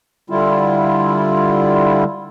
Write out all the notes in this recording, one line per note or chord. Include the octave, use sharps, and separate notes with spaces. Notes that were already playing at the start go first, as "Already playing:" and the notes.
D3 G3 E4 F4